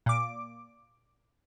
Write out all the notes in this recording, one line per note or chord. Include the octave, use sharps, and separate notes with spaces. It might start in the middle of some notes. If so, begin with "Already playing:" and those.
A#2 D6